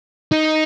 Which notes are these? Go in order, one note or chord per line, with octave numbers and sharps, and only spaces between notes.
D#4